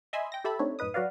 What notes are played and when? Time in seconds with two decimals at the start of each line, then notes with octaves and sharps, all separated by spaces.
0.13 D#5 E5 G#5 B5 C6
0.32 G5 A#6
0.44 G4 A4 E5 A5 B5
0.59 A3 C4 D4 D#4 C#5
0.79 F#2 A2 D#4 B4 D#6
0.94 F#3 F#4 B4 D5 F5